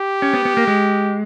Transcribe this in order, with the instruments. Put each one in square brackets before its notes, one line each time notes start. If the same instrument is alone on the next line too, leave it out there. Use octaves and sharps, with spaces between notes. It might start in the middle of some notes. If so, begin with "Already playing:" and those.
Already playing: [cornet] G4
[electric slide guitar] C#4
B3
B3
A#3
G#3